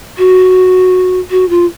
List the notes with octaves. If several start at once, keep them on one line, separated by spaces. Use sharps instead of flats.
F#4
F#4
F4